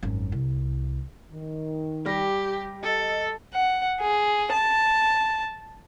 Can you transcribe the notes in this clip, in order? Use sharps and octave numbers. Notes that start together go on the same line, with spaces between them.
G#1 F#2
C2
D#3
G3 G4 G5 A#6
A4 D#5
F#5
G#4
A5